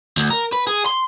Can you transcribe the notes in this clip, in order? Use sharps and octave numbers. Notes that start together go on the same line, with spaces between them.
D2
A#4
B4
G#4
C6